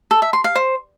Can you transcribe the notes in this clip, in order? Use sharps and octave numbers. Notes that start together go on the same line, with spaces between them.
A4
E5
C6
F5
C5